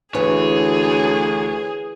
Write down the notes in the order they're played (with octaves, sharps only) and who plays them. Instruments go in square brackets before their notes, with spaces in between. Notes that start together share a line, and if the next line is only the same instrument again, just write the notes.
[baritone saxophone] D2 [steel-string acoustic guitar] E3 [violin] G#4 [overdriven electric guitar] C#5